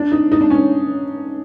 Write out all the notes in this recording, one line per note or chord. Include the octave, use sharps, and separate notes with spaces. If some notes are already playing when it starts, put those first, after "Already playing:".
Already playing: D4
D#4
D#4
D4
C#4